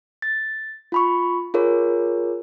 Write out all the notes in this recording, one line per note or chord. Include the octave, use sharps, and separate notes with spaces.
A6
F4 B5 C#6
F4 G#4 A#4 C#5